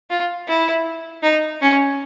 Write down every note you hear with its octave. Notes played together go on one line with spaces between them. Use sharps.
F4
E4
D#4
C#4